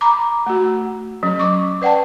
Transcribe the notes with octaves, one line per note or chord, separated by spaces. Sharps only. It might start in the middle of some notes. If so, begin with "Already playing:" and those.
A#5 B5 D6
A3 F#4
F#3 C#4
C#6 D6
B4 D5 F#5 G5 A5